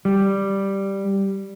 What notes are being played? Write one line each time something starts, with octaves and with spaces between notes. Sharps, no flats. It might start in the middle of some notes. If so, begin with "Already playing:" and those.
G3